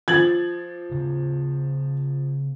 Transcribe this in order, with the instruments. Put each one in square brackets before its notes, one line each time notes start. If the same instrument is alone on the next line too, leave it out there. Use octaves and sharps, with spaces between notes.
[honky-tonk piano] F3 A6 F#7 [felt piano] G#6
[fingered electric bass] C#3 B3